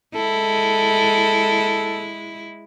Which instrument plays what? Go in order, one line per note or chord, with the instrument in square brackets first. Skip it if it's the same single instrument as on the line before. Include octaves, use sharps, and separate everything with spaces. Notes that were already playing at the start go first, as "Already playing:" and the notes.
[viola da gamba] G#3 E4 [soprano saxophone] A4